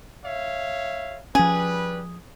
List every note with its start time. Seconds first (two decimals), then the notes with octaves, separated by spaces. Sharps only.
0.25 C#5 E5 F5
1.35 F3 G3 C#4 G#4 B4